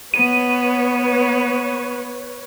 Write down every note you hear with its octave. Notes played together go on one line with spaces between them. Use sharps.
B3 B4 C#5 D#7